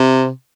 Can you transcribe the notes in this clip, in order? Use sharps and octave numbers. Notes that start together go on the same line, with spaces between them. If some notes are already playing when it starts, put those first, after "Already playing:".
Already playing: C3